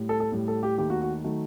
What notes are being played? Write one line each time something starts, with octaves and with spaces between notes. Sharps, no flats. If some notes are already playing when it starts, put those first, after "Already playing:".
Already playing: A2 G3
A4
A4
A2 G3
A4
G4
D#2 D#3 A3 G4
F#4
F#4
D#3 F#3 A3